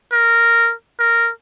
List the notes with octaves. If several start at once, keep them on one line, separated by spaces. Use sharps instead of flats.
A#4
A#4